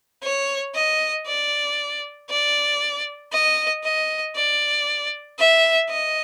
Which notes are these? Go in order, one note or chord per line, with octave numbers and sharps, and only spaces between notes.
C#5
D#5
D5
D5
D#5
D#5
D5
E5
D#5